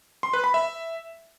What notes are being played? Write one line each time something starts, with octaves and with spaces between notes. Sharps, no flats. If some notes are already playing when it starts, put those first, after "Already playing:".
C6
B4
B5
E5